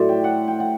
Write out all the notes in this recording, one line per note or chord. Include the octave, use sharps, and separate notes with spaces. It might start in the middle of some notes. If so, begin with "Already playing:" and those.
Already playing: A2 F#3 C5 D5 E5
G5
F#5
G5
F#5